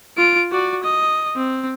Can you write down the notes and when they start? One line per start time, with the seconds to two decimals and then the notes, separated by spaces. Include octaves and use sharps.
0.17 F4 D7
0.51 F#4 D5
0.83 D#5
1.36 C4